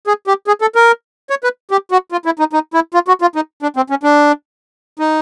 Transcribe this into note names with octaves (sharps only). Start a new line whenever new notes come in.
G#4
G4
G#4
A4
A#4
C#5
B4
G4
F#4
F4
E4
D#4
D#4
E4
F4
F#4
F4
D#4
D4
C4
C#4
D4
D#4